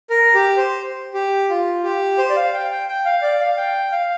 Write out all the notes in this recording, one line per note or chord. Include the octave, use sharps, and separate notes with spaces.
A#4
G4
C5
G4
F4
G4
C5
D5
F5
G5
G5
G5
F5
D5
F5
G5
F5